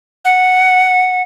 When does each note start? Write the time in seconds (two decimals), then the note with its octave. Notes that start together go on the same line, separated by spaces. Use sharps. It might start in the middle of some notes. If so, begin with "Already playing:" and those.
0.25 F#5